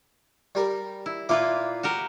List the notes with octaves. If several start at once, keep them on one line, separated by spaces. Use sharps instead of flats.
G3 A#4
E4
A#2 A#3 E4 F4 B4 D6
F#4 G4 A#4